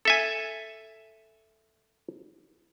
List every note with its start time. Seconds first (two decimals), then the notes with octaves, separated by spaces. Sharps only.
0.05 A4 E5 G#5